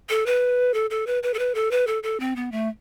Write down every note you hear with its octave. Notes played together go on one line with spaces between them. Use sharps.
A4
B4
A4
A4
B4
B4
A4
B4
A4
B4
A4
A4
C4
B3
A3